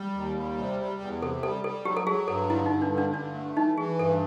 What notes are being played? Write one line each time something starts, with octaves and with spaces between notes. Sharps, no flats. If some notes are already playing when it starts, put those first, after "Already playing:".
Already playing: G3
D#2
G3
C3
G3
E2
C3 A4
G3 A4
G3 A4
F#3 G4
A4
F#3 G#4
G2 A4
D3 E4
D#4
G2
D4
D3
D4
G2 D4
A3
E3 D#4
E3 G#4
G2 A4